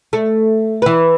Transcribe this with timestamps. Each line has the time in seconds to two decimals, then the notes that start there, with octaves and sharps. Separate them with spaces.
0.13 A3
0.82 E3 B4